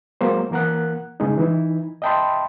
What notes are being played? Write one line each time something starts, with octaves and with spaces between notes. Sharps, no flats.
F#3 G#3 A#3 C5
E3 A#3 A#4 F#5 F#6
C#3 G#3 D#4
E3 D#4 E4
D#5 E5 G5 A5 B5 C6